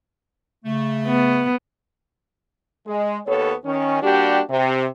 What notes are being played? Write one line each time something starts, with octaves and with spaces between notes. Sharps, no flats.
C#3 A3
B3
G#3
D#2 B3 A4 C#5
D#3 C#4
G3 A#3 D4 F#4 G4
C3